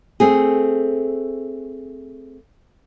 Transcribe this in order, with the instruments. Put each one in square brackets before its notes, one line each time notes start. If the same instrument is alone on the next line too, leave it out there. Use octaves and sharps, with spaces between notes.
[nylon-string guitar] A3 C4 G#4